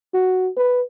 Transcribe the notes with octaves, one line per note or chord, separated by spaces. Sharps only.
F#4
B4